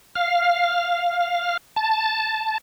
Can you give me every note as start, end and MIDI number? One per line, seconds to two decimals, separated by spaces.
0.15 1.57 77
1.76 2.58 81